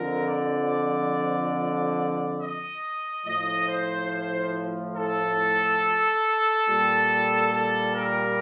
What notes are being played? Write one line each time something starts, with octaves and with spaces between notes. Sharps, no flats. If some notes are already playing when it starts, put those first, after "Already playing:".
Already playing: F2 D3 F3 A#4
D5
D#5
A2 F3 D#5
C5
C5
A4
A#2 G3
A4
A#4